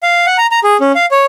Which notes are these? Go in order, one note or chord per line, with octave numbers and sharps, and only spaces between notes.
F5
F#5
A#5
A#5
G#4
C#4
F5
C#5